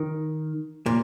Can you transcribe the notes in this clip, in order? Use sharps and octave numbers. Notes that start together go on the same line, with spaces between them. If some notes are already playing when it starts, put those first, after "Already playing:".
Already playing: D#3
A#2